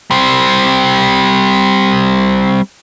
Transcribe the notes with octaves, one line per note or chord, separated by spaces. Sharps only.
G3 C4